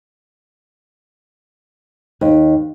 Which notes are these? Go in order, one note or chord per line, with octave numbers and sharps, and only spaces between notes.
D#2